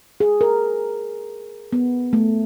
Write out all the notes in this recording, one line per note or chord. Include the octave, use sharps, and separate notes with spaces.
G#4
A#4
B3
A3